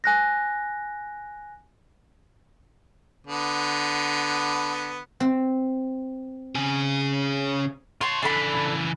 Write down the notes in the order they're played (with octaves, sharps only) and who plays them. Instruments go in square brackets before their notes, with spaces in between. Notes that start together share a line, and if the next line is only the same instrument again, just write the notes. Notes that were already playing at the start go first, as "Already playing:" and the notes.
[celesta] G#5 F#6 A#6
[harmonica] D3 B3
[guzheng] C4
[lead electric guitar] C#3 G#4
[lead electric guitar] F4 C#5 [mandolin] A5 C6
[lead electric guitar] C#3 E3 [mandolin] D4 A4 B5